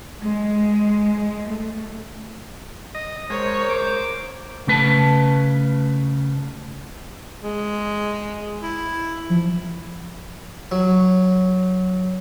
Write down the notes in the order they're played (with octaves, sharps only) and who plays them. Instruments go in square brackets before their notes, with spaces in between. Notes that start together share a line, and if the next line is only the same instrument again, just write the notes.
[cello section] G#3
A3
[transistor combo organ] D#5
[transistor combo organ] G#3 [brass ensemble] A#4 C5 [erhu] C#5
[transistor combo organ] D6
[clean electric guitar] C#3 A3 B4 A5
[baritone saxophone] G#3
E4
[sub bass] F3
[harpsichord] F#3